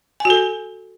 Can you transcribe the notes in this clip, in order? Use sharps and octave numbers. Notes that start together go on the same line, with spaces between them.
F#4 A4 G#5